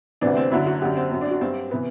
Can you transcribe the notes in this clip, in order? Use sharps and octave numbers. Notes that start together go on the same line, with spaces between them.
D2 C3 E3 D4
C4
F#2 D3 F#3 E4
F#4
F#2 D3 F#3 G4
C4
F#2 F#3 C4
D4
F#4
G2 F#3 C4
C3 E3 B3